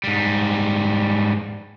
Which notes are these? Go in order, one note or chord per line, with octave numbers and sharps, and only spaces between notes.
G#2 G3